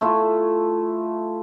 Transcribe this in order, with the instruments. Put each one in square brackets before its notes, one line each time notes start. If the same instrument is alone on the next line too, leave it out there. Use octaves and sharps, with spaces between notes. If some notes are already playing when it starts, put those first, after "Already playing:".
[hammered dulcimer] A3 E4 F4